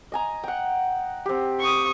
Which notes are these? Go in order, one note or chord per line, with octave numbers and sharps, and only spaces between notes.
D#5 G#5 A#5
F#5 G5
C4 G4
C#6 D#6